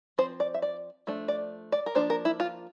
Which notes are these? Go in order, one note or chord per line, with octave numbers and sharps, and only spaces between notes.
F3 C4 C5
D5
E5
D5
F3 A3 D4
D5
D5
A#4
F3 A#3 D4 C5
A#4
E4
F4